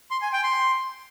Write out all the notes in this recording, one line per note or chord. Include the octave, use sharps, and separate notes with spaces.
C6
G#5
G5
C6